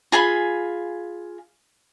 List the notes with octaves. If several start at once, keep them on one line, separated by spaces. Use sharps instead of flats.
F4 G#4 G#5 B5